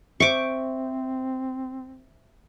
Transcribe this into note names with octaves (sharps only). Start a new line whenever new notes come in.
C4 C5 E5 C#6 D6